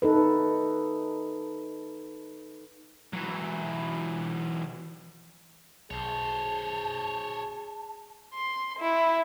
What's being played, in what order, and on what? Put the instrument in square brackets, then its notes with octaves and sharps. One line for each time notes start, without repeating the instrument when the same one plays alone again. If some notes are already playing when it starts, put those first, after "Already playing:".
[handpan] D#4 A4 B4
[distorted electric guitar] E3 F#3
[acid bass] B1 [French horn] G#4 [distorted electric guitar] C5 C#5 [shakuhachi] A5
[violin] C6
E4